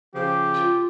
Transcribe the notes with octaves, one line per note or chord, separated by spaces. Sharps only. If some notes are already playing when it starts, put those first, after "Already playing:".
C#3 F3 G4
F4